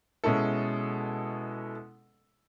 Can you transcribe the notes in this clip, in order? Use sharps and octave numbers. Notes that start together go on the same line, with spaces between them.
B2 G#3 C#4 E4 A4